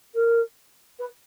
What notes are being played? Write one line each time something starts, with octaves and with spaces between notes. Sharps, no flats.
A#4
B4